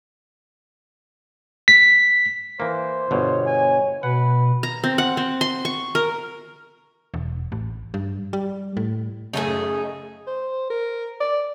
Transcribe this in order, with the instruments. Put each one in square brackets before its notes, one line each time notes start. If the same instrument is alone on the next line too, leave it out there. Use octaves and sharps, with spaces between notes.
[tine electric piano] B6
[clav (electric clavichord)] E3 A#3 [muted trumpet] C5
[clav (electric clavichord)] G1 B2 [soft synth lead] C#5
[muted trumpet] G#5
[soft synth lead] B2 [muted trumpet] B4 [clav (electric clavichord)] F#5
[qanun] A#5
C4
F#5
C4
C6
C#6
A#4
[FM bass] E1
A1
G2
G3
A2
[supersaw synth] F#2 C#3 A3 [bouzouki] D#4 G#4
[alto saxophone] C5
A#4
D5